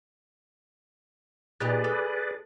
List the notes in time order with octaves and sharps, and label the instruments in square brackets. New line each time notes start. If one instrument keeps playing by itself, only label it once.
[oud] A#2 D#4 G4 [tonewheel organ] G#4 B4 D5
[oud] A4